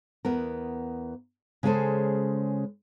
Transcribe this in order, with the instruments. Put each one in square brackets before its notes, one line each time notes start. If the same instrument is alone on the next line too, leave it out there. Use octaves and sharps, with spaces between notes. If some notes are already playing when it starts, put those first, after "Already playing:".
[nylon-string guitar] E2 B3 A#4
C#3 G#3 C#4 G#4 A4 C5